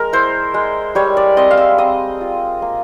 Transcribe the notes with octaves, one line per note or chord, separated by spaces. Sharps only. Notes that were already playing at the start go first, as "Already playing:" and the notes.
Already playing: G#3 A#4
E4 C5
G#3
G3 C#5
D5
C4 D#5
F5
E5
C4 D#5
F4
A#3